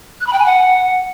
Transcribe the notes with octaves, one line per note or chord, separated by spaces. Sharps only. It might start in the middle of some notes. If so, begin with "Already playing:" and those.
F#6
B5
G5
G#5
F#5